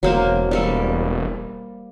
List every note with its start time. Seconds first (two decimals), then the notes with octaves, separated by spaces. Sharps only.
0.03 E1 F#3 A#3 C5
0.51 G3 A#3 A4